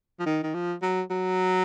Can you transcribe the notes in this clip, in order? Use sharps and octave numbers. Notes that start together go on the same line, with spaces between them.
F3
D#3
D#3
F3
F#3
F#3